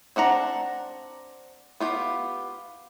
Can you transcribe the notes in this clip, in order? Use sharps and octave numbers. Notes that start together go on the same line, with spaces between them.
C4 D4 F#5 A#5
B3 F4 G4